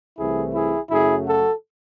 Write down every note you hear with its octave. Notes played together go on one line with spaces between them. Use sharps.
C2 C3 E3 A3 E4 G#4
E4 G#4
F#2 C#3 F#3 A3 E4 G#4
F#4 A4